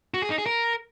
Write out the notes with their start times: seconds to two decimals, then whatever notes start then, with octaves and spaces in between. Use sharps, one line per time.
0.14 F#4
0.22 G#4
0.30 D#4
0.38 G#4
0.46 A#4